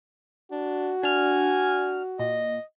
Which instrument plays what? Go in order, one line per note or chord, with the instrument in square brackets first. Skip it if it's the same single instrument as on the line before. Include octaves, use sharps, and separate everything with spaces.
[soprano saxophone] D4 [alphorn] F#4
[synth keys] D4 F6 [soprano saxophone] G#5
[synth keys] A#2 [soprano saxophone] D#5